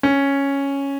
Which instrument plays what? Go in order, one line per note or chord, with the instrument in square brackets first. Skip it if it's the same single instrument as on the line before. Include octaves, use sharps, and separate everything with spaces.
[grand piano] C#4